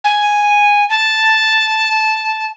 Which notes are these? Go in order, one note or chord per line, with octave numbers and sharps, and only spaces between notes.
G#5
A5